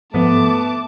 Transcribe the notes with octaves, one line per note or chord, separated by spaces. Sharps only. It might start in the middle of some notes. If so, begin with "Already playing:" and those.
G#2 F3 A3 B3 B4 A5 D6